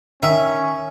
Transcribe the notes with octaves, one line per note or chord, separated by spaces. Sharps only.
D#3 C#4 E5